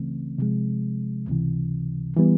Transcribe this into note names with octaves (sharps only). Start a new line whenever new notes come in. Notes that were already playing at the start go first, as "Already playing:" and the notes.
Already playing: C#2 C#3 E3 A3 C4
C3 F3 G#3
C#2 C3 E3
E3 G3 B3